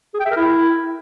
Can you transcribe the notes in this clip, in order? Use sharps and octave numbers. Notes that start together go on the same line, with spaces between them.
G#4
G5
E5
A#4
E4